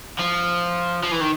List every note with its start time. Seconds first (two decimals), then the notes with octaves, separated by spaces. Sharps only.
0.19 F3
1.03 F3
1.11 E3
1.21 D#3